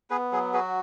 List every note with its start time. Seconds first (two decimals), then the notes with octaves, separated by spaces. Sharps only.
0.10 B3 G#4 B4
0.32 F#3 G#4
0.53 F#4 G#4 B4